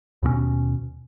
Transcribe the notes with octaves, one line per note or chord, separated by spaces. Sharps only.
D#2 B2 A3 C#4